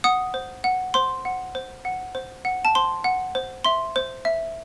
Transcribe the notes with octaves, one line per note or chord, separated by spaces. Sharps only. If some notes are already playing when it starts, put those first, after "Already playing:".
F#5 D#6
C5
F#5
C5 C6
F#5
C5
F#5
C5
F#5
A5
C5 C6
F#5
C5
E5 C6
C5
E5